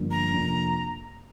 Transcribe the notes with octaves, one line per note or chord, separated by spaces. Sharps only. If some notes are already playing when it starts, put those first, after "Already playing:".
Already playing: G1 G2 F3 A#3
A#5
F2 C3 F3 A#3 D4